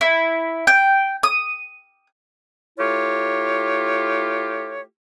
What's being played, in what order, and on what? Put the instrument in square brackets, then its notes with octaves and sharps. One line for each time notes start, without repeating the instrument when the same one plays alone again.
[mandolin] E4
G5
D#6
[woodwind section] A3 E4 F4 G4 C#5